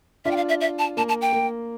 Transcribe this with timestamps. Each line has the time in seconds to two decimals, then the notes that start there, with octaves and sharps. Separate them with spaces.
0.25 D4 F4 E5
0.31 G5
0.37 F5
0.49 E5
0.61 E5
0.79 A5
0.97 A#3 A5
1.09 A5
1.22 G5
1.33 A#3